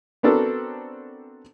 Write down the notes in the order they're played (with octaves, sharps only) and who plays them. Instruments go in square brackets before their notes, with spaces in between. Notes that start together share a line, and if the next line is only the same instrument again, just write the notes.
[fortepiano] B3 C4 D4 F#4 A4 A#4